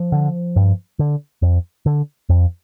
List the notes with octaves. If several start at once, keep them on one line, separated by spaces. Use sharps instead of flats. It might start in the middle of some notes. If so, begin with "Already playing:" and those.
Already playing: F3
D3
G2
D3
F2
D3
F2